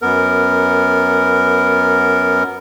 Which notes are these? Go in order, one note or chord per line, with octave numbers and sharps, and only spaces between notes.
F#2 B3 A#4